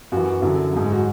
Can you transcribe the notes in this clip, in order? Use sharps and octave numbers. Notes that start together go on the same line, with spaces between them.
F#2 E3 F#4
F#2 D3 F#3 E4
G#2 F#3
F#4